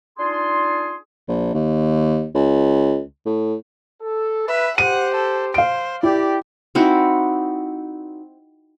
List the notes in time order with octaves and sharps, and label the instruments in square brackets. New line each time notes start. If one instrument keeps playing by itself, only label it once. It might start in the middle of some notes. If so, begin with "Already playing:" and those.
[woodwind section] D4 D#4 F4 G#4 C6
[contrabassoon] A#1
D#2
C#2
A2
[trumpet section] A4
[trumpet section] B4 [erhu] E5
[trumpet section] G4 C5 [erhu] F#5 [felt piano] D#7
[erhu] A4
[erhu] C5 [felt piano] F5 D7
[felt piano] E4 [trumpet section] G4 [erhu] D5
[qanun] C4 D#4 E4 F#4